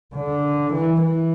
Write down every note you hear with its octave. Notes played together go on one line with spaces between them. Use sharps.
D3
E3
E3